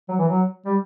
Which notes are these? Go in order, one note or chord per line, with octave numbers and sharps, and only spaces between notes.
F#3
E3
F#3
G3